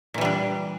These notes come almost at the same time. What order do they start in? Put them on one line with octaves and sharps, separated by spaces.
A#2 E3 G3 D4